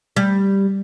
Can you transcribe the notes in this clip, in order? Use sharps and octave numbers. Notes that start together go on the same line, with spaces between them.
G3